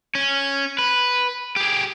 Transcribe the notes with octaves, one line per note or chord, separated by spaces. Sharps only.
C#4
B4
G4 G#4